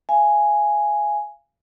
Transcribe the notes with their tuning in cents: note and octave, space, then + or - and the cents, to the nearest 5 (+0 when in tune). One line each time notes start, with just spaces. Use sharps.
F5 -35 G#5 +0